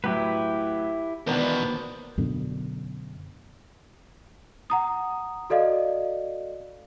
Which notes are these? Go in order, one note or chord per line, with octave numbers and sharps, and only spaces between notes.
A2 F#3 E4 G4 B4
E2 B2 D#3 B3 D4 A#4 C5
F#2 B2 D3
F#5 A#5 D#6
F#4 A4 D5 D#5 F5